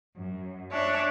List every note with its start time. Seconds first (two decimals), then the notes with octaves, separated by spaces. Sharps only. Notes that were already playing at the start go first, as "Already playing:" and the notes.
0.17 F#2
0.71 D4 C#5 E5